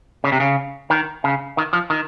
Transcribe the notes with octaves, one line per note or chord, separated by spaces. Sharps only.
C#3
C3
C#3
D#3
C#3
D#3
F3
D#3